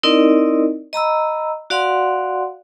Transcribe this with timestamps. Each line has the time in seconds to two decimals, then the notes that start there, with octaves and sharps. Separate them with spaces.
0.03 C4 D#4 E4 A#4 D5 D#5
0.93 D#5 A#5 B5 E6
1.70 F#4 D5 F5 F#5 C6